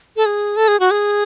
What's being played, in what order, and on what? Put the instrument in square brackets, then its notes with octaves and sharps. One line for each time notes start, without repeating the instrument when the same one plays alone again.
[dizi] A4
G#4
A4
G#4
F#4
G#4